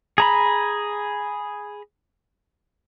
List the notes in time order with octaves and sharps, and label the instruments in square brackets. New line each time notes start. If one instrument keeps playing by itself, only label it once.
[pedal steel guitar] G#4 A#5 B5